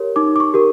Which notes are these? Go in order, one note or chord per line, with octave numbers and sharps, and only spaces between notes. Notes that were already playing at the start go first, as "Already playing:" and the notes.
Already playing: G4 A#4 C#5
D#4 D6
D6
C#6
G4 A#4